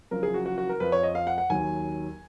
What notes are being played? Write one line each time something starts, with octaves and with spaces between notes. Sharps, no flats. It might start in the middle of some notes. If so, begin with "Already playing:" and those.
F#1 F#2 F3 A#4
G#4
F#4
F#4
F#4
A#4
F2 F3 B4
C#5
D#5
F5
F#5
F#5
D#2 D#3 F#3 G#5